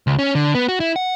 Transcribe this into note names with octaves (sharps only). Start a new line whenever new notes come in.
C#2
C#4
D3
B3
F#4
E4
F#5